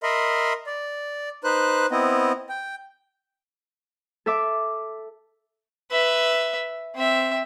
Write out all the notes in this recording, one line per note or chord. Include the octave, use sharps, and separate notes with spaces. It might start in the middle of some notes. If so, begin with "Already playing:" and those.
A#4 D#5 E5 B5 C6
D5
D#4 B4 C5 F#6
B3 C4 E4 D#5
G5
A4 E5 D6
B4 E5
C4 E5